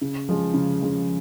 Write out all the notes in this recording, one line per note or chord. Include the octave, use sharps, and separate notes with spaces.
C#3
F3 G#3 C#4
C#3
F3 G#3 C#4